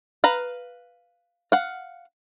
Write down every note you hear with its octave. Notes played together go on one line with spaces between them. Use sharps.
B4 F5 A#5
F5 F#5